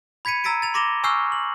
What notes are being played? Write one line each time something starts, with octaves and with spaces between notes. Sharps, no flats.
B5 G#6 B6 C#7 D#7
A#5 E6 A6 B6 D7 D#7
A6 F7
C6 D6 A#6 E7 F7 G7
G#5 C#6 E6 F6 G6 C7
F#7